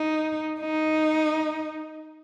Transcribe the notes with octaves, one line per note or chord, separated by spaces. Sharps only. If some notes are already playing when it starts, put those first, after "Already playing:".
Already playing: D#4
D#4